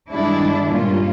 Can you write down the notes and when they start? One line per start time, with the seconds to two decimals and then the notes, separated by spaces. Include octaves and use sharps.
0.11 G2 D#3 G3 G#3 D4 E4
0.67 G2 A#2 A#3 C#4 F4